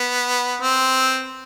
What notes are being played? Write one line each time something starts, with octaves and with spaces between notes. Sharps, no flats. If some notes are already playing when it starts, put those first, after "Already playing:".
Already playing: B3
C4